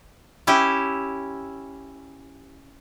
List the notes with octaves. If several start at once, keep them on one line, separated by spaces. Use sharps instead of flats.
C#4 E4 G4